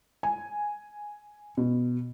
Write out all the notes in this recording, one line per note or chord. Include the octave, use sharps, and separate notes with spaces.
G#5
B2